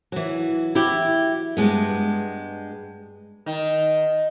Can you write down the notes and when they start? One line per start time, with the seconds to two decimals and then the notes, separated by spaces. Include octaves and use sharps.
0.12 E3 F#3
0.75 E4 F#4 G4
1.57 G2 G#3 B3
3.46 D#3